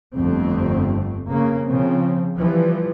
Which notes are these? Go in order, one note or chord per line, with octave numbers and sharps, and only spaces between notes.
G1 F2 D3 A3 C4
C#3 A#3
C#3 F3 C4
E3 F3 G3